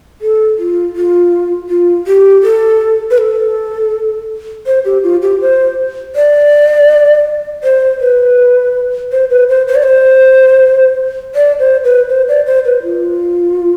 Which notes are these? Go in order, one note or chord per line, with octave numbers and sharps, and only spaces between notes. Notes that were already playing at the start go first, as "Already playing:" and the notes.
A4
F4
F4
F4
G4
A4
B4
A4
C5
G4
F4
G4
C5
D5
C5
B4
C5
B4
C5
C5
D5
C5
D5
C5
B4
C5
D5
C5
B4
F4